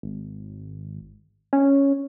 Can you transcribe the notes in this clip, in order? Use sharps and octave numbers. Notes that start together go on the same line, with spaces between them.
G#1
C#4